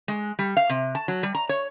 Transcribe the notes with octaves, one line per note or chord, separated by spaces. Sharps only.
G#3
G3
F5
C3
A5
F#3
G3
A#5
C#5